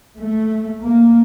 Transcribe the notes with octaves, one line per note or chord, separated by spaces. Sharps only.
A3
A#3